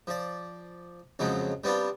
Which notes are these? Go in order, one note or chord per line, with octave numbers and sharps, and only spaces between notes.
F3 D5
F2 C#3 F3 F#3 G#3
G3 B3 C4 D4 F4